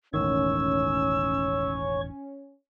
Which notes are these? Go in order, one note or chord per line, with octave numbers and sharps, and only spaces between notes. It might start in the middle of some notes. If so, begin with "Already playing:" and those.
E1 A1 D#3 C#4 C#5 C#6 E6